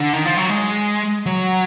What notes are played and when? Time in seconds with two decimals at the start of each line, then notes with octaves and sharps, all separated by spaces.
0.00 D3
0.13 D#3
0.26 F3
0.37 F#3
0.49 G#3
1.26 F#3